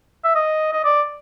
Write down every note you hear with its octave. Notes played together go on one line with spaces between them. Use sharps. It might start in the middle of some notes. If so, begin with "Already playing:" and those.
E5
D#5
D#5
D5